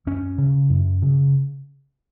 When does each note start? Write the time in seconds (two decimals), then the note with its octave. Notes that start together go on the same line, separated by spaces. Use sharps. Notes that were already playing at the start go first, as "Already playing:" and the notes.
0.07 F#2 C#4
0.38 C#3
0.69 F#2
1.02 C#3